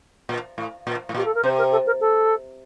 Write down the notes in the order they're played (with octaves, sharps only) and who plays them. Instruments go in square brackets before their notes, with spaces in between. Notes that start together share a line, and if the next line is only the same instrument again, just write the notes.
[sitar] A#2
A2
A#2
A2
[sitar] A#2 [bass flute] G4
[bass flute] A4
A#4
[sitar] C3 [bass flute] C5
[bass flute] A#4
A4
A#4
A4